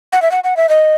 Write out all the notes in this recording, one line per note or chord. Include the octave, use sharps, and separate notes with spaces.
F#5
E5
F#5
F#5
E5
D#5